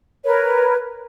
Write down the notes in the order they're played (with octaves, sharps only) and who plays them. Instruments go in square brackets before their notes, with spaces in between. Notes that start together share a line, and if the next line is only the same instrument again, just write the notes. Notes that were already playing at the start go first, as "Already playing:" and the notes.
[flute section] A#4 B4 C#5